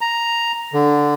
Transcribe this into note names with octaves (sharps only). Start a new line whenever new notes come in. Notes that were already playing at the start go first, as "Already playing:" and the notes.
A#5
D3